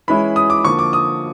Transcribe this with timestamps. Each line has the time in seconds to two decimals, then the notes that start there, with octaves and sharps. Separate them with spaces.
0.08 E3 G#3 C#4 E4 B5
0.36 D#6
0.50 D6
0.64 D3 F3 A#3 C#6
0.79 D6
0.93 D#6